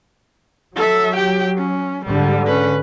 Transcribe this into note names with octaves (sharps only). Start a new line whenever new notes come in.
F#3 A4 E5
G4 G5
C#4
G#2 D3 G3
C#4 B4